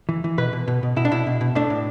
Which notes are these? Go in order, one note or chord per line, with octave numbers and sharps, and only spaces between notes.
E3
E3
B2 B4
B2
B2
B2
B2 E4
D4
B2 E4
B2
B2
A2 D4
A2